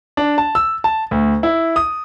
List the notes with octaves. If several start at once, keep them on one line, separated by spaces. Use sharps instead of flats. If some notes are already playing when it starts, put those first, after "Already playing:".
D4
A5
E6
A5
D2
E4
D#6